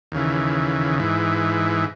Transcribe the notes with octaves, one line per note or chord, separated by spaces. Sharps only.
D#2 C#3 E3
G#2 E3